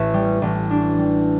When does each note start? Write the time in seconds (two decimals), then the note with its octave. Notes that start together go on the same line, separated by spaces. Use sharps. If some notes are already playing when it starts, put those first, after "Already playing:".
Already playing: A1 E5
0.14 G3
0.42 A1
0.71 D4
0.98 G3